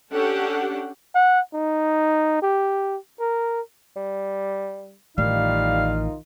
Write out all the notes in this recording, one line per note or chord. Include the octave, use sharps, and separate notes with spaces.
C#4 D4 G4 A4 F#5
F#5
D#4
G4
A#4
G3
A1 D#3 G3 D#4 F4 F5